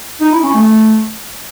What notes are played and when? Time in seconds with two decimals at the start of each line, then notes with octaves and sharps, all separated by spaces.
0.21 D#4
0.32 E4
0.43 C#4
0.54 A3